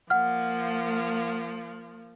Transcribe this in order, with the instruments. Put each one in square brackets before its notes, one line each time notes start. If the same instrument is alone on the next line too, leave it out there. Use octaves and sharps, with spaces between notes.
[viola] F3 A#3 [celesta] F#5 F6